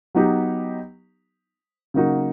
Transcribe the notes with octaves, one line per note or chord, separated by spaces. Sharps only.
F#3 B3 D#4 G4
C#3 F#3 A#3 D#4 F#4